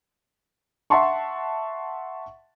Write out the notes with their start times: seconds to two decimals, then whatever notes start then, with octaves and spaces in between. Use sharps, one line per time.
0.90 E5 F#5 A5 C6 C#6